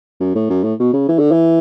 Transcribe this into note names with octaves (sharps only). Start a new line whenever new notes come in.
F#2
A2
F#2
A2
B2
C#3
E3
D3
E3